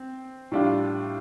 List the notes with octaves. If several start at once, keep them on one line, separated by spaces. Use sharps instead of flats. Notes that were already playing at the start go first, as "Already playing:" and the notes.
Already playing: C4
A2 G3 D4 F4